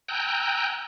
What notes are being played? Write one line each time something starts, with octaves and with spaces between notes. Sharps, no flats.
G5 G#5 A#5 E6 F#6 G6